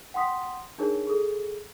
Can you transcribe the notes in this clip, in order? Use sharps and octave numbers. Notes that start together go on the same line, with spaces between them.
F#5 G5 C6 D#6 B6
D4 D#4 G#4 A#4 C#5
G#4 A4